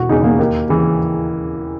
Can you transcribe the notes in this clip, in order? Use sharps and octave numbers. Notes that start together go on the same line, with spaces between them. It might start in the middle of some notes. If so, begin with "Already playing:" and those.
Already playing: E1 F#4
E2 C#3 E3 D#4
A#3
D#2
C#3 E3